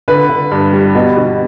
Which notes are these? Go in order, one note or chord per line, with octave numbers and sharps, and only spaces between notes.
D3 B4
D3
G2
G3
B2
B2